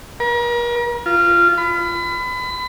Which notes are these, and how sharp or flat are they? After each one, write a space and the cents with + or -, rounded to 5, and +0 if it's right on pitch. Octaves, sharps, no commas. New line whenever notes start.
A#4 +40
F4 -15
B5 +30